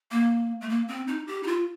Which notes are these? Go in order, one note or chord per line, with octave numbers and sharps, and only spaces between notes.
A#3
A3
A#3
C4
D#4
G4
D#4
F4